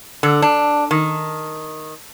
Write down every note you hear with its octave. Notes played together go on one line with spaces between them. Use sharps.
D3
D4
D#3